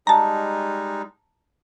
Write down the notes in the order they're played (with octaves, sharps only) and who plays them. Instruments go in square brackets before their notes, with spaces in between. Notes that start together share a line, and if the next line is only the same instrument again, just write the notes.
[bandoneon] G3 G#3 D#4 [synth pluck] A5 A#5